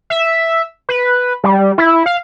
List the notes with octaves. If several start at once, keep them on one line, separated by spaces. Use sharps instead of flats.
E5
B4
G3
E4
F5